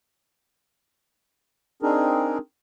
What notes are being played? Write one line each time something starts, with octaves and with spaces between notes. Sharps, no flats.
C4 D4 D#4 G#4 A#4